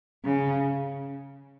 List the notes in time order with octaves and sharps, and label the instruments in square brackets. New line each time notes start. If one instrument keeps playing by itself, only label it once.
[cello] C#3